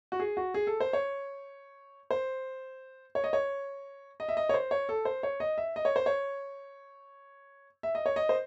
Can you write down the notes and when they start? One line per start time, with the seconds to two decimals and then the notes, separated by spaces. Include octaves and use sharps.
0.12 F#4
0.20 G#4
0.37 F#4
0.54 G#4
0.67 A4
0.80 C5
0.93 C#5
2.11 C5
3.15 C#5
3.24 D#5
3.33 C#5
4.20 D#5
4.29 E5
4.37 D#5
4.49 C#5
4.54 C5
4.71 C#5
4.89 A4
5.05 C5
5.23 C#5
5.40 D#5
5.58 E5
5.76 D#5
5.85 C#5
5.96 C5
6.06 C#5
7.83 E5
7.95 D#5
8.06 C#5
8.16 D#5
8.29 C5